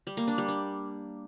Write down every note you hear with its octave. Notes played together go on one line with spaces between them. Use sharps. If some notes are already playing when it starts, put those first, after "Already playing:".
G3
A#3
D4
G3
D4